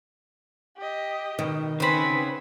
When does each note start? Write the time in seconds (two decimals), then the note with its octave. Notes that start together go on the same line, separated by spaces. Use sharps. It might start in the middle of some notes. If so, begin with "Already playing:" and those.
0.77 G4 D#5
1.39 B2 D#3
1.80 C#3 B3 C4 B4 G#5 B5